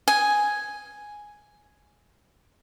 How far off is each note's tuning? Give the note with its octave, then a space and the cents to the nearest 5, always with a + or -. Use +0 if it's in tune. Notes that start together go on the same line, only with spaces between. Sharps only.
G#5 +0 D#6 +10